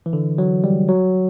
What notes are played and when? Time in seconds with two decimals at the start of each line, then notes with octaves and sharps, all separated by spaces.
0.06 E3
0.13 D3
0.38 F#3
0.64 G3
0.89 F#3